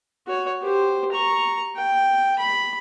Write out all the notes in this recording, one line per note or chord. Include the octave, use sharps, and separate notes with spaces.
F#4 C#5
G4 C5
A#5 C#6
G5
B5